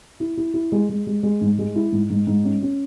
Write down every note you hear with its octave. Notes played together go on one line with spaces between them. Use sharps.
E4
E4
E4
G#3
G#3
G#3
G#3
G#2
G#3
E4
G#2
G#2
G#2
C#4
C#4